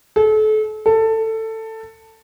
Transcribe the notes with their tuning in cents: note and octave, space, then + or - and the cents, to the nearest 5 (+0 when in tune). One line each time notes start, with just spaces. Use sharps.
A4 -35
A4 +15